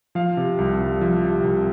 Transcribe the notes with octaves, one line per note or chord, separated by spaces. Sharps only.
F3 F5
C3
C2
C2
F3
C3
C2